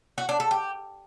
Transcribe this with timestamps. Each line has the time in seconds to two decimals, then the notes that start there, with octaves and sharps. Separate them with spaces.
0.18 F#4
0.29 D4
0.40 A4
0.51 G4